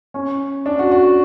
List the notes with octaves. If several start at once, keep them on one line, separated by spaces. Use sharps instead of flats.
C#4
D4
F#4
F#4